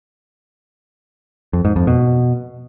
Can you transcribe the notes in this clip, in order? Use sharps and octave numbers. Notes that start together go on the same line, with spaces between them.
F2
G#2
F2
B2